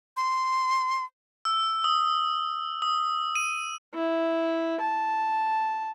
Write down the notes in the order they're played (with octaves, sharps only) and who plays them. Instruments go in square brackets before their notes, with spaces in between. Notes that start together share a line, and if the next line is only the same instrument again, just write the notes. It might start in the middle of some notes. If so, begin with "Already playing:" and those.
[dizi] C6
[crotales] E6
D#6
D#6
D#7
[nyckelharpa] E4
A5